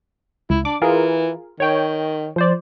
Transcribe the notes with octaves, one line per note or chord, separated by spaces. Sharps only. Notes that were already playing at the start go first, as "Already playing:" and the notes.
C#2 E4
D4 D6
E3 F4 G#4 A#4
D#3 C#5 G5
F3 C5 D5